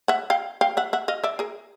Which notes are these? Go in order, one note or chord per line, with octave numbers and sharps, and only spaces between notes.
E5 F#5
F5 G5
F5 G5
E5 F#5
E5 F#5
D#5 F5
D5 E5
G#4 A#4